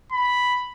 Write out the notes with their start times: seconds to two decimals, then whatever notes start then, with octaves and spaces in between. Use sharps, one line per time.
0.12 B5